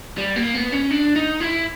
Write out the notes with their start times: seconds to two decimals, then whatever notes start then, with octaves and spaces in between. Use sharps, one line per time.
0.18 G3
0.36 A#3
0.55 B3
0.73 C#4
0.91 D4
1.16 D#4
1.40 E4